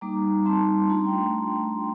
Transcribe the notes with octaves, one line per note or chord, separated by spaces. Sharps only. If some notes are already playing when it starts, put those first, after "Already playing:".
G3 A#3 D#4 A#5 D6
G3 C4 D#4 A5 C6
A3 D4 F4 A#5
C6
G5 A#5